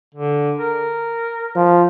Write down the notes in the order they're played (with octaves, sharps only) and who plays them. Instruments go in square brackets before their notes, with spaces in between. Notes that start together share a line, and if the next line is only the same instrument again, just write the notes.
[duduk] D3
A#4
[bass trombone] F3